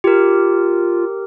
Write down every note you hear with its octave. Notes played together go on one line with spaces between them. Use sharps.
F4 G4 A#4